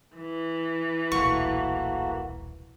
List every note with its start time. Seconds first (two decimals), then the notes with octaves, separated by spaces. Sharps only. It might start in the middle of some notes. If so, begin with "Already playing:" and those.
0.17 E3
1.12 D#1 B1 A3 A#3 F#4 C#6